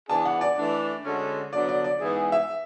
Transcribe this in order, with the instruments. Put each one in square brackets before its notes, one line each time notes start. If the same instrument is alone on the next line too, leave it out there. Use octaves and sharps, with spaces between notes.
[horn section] E3 B3 D4 G#4 [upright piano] A5
[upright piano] F#5
D5
[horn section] E3 A3 D4
D3 G#3 C#4 F#4 A4
[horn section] D3 F#3 B3 D4 F#4 [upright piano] D5
[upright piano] D5
D5
[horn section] G#2 E3 B3 E4 G#4
[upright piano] E5